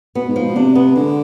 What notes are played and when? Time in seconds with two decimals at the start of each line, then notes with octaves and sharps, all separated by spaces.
0.15 B2 B3
0.29 G#2
0.36 F3
0.42 B2
0.56 C3 D4
0.75 B3
0.96 D3 G#3